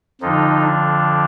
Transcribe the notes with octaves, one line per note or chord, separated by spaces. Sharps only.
F2 D3 F3 D#4
D4